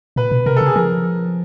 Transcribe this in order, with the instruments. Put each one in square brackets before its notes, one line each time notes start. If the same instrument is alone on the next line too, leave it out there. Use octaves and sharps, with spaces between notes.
[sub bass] A#2 [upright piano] B4
[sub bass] B2
[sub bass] C3 [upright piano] A#4
[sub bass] C#3 [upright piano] A4
[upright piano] G#4
[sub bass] F3 [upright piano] A#4